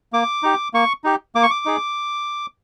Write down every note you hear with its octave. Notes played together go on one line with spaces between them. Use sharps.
A#3 D6
D#4 G4
A#3 C#6
D#4 G4
A#3 D6
C#6
D6
D#4 G#4